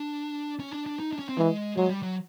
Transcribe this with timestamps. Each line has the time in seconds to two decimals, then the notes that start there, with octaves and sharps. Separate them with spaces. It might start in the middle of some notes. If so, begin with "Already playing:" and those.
Already playing: D4
0.60 C#4
0.73 D4
0.86 D4
1.00 D#4
1.13 D4
1.19 C#4
1.29 C4
1.38 E3 G#3
1.77 F#3 G#3
1.90 G3
2.02 F#3